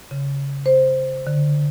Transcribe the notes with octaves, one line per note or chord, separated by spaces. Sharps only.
C#3
C5
D3